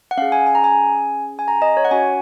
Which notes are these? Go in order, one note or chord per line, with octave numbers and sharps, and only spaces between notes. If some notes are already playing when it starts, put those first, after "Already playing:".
F#5
C#4 G#4 F5
G#5
G#5
A#5
G#5
G#5
A#5
D#5
C#5
F#5
C#4 F#4 G#5